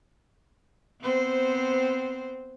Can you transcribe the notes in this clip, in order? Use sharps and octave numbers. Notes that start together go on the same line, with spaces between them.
B3 C4 C5